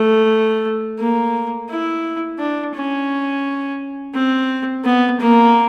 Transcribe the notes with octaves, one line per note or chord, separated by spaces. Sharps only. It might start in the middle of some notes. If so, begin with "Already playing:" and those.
Already playing: A3
A#3
E4
D4
C#4
C4
B3
A#3